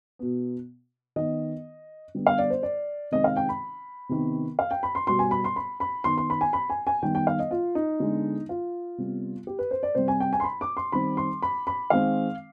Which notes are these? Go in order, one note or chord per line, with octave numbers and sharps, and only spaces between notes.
B2 B3
D#3 B3 D#5
D3 G3 B3
F5
D5
C5
D5
C3 D#3 G#3 C4 D#5
F5
G5
B5
C3 D#3 B3
F5
G5
B5
C6
B2 G3 B3 C6
G#5
B5
C6
B5
B5
D#3 B3 C6
C6
B5
G#5
B5
G#5
G#5
D#3 G3 B3 G5
G5
F5
D#5
F4
D#4
D3 G#3 B3
F4
C3 G3 B3
G4
B4
C5
D5
C3 G3 C4 C5
G#5
G5
G#5
C6
B5
D6
C6
D#3 G3 C4 B5
C6
B5
B5
D#3 G#3 C4 F5